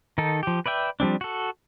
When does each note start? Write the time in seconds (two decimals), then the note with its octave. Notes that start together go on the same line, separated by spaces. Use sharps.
0.18 D#3 D#4 A4
0.43 F3 G4
0.66 B4 D5 E5 G5
1.00 F3 G3 C4 D4
1.21 F#4 A4